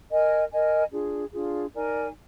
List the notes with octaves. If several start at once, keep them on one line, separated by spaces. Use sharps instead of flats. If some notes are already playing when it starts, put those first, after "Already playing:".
A#4 D#5 G#5
A#4 D#5 G#5
D4 F4 G#4
D4 F4 G#4
D#4 A#4 D5 G#5